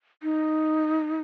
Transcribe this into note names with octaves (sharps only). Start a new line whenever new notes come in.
D#4